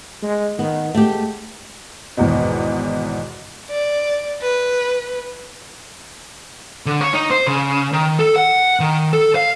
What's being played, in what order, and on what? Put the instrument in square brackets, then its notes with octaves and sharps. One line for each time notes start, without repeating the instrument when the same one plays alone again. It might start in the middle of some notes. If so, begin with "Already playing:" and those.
[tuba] G#3
[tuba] D#3 [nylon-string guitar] B3
[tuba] G#3 [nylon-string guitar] A3 G4
[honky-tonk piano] G#1 E2 B2
[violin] D5
B4
[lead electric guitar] D3
C#5
D#4
C5
C#3
D#3
A4
F#5
D#3
A4
F5